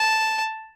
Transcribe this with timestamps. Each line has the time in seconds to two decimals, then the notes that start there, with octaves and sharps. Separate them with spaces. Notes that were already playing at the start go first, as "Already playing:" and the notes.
Already playing: A5